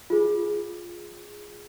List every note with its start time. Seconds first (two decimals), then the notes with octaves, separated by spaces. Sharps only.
0.10 F4 G#4